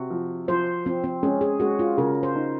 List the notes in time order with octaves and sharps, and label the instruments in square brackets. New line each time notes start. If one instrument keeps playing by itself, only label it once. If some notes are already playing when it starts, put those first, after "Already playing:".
Already playing: [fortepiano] C3 [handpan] F#4
[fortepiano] F3
[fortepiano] F3 [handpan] C5
[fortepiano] F3 [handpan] C4
[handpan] C4
[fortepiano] G#3 [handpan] C#4
[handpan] G#4
[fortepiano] G#3 [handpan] F#4
[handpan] F4
[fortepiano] C#3 [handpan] A#4
[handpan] C5
[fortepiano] D#4